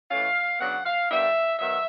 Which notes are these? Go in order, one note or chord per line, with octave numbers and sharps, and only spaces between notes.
E3 A3 C#4 F5
C#3 F#3 B3 D4 F#5
F5
D#3 G3 B3 D4 E5
D#3 F#3 B3 E5